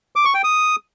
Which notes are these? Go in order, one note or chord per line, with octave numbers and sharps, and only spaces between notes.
D6
C#6
G5
D#6